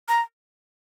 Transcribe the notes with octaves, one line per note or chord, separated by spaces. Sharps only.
A#5